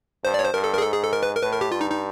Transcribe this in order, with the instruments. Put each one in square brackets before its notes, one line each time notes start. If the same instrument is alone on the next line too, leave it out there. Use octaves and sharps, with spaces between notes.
[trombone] G2 [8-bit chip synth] C5
[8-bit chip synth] D5
C#5
C5
[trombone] G2 [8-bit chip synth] A#4
[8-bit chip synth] A4
A#4
G#4
[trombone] G#2 [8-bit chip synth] A4
[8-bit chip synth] G#4
A4
A#4
B4
A#4
[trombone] A2 [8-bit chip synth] B4
[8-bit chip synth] A#4
G4
[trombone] G2 [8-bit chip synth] F4
[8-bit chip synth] D#4
D#4